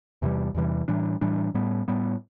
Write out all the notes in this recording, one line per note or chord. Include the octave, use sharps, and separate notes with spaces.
E2 C3 E3 G3
E2 C3 E3 G3
A2 E3 G3 D4
A2 E3 G3 D4
A2 G3 B3
A2 G3 B3